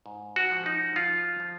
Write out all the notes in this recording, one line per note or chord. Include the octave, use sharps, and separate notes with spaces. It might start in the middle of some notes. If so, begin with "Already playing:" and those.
G#2
F#4
F3
D#4
F3 F4
F3